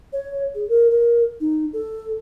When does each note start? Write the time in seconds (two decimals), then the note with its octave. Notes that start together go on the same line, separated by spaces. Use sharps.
0.13 C#5
0.55 G#4
0.69 A#4
0.90 A#4
1.41 D#4
1.73 A4